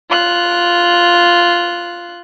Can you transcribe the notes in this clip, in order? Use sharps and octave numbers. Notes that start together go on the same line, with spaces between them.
F4 F#6